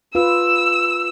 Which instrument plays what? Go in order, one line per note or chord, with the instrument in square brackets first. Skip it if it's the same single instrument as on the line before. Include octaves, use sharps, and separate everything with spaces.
[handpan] F4 B4 [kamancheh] E6